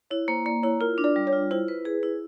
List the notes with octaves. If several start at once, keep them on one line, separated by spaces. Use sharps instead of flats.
E4 C#5
A#3 C5
A#3 D5
E4 C#5
F4 A#4
D4
D5
G3
C#5
F4
E4 C5
B4
G#4
E4